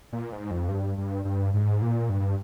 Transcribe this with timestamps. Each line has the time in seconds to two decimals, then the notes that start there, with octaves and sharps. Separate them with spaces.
0.13 A#2
0.32 G#2
0.51 F2
0.68 G2
0.98 G2
1.25 G2
1.54 G#2
1.82 A#2
2.09 G2